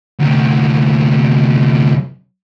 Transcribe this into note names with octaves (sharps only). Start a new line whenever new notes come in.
D2 C3